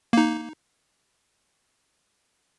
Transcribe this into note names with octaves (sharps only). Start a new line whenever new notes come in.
A#3 D#4